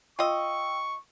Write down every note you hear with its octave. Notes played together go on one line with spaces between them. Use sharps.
F4 D#5 G5 C#6 E6